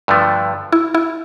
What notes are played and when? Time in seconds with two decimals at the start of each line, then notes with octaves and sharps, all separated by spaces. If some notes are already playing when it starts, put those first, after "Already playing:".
0.08 G2 D3 F3 A3
0.72 E4
0.94 E4